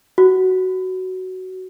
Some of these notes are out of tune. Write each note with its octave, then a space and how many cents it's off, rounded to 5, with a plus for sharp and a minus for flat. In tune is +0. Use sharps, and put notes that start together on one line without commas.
F#4 +10